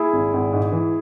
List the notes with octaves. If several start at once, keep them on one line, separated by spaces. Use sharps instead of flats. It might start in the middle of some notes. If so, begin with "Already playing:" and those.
Already playing: E4 G#4
G#1
G#1
G#2
E3